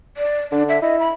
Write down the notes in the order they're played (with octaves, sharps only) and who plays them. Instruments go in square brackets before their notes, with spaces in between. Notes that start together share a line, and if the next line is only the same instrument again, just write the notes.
[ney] D5
[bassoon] D3 [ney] D4
[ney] E5
[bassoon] E4 [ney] D#5
[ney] B5